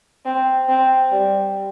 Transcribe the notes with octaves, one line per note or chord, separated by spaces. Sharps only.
C4
C4
G3